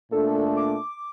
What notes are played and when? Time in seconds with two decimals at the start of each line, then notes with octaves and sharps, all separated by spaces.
0.12 A#2 A3 D4 A4
0.57 D6